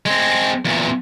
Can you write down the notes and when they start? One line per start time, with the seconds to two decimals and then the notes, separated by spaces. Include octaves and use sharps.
0.06 G#3 C4
0.65 E2 A#2